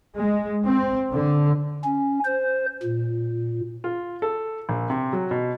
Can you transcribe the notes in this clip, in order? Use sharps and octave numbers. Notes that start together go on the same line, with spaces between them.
G#3
C4
D3
C#4
C5
A#2
F4
A4
A#1
C3
F#3
B2